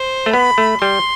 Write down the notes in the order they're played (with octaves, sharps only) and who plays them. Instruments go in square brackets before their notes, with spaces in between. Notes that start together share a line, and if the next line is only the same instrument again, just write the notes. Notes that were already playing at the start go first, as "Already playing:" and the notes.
Already playing: [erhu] C5
[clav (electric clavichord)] A3
[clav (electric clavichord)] B3 [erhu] B5
[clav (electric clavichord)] A3
[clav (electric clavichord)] G3 [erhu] C6